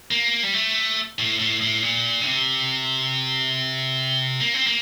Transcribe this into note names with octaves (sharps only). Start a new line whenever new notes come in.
A#3
G3
A3
A2
A2
A2
A#2
D3
C3
A#3
C4
A#3